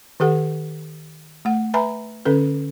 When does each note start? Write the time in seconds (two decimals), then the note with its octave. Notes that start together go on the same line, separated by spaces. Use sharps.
0.20 D#3 G4 A4 F#5
1.45 A3 F#5
1.74 B4 E5 G#5 A#5 B5
2.25 D3 C#4 A4 B4